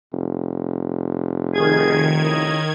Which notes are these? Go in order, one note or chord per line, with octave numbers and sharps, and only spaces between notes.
F1
D#3 G#4 G#6
C#3 E4 D#5